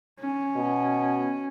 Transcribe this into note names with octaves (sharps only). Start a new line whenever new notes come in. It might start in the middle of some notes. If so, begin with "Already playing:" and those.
C#4
B2